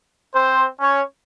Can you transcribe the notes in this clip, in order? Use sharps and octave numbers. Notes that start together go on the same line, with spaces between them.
C4 C5
C#4 C#5